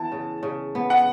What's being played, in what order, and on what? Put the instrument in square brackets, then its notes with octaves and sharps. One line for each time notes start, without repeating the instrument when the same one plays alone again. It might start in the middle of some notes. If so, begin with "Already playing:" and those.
Already playing: [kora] E3 B3 [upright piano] A5
[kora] C#3
C#3
B3
[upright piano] F#5